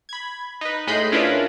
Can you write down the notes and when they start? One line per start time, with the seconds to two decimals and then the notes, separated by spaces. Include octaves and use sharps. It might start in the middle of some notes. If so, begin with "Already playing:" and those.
0.09 B5 G#6
0.61 D#4 B4
0.87 A2 G#3 D#5 B5 C6 G6
1.12 C#4 D4 E4 F4 A#4 B4